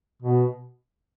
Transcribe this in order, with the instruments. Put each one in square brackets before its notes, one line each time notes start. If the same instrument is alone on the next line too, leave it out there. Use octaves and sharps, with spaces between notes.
[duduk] B2